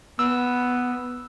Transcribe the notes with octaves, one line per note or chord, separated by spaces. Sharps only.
B3 E6